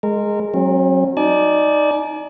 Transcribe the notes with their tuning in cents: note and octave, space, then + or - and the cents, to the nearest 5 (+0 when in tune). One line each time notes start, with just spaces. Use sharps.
G#3 +0 A#4 -20
F#3 +0 C4 +45
D#4 +0 D5 +0 G#5 +45